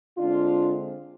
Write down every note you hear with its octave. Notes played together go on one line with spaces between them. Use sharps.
D3 G#3 C4 D4 F4